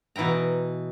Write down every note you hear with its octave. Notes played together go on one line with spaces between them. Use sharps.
B2 E3 E4 G5 A#5